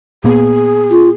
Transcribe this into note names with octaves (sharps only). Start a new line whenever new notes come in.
A#2 A#3 B3 G#4
F4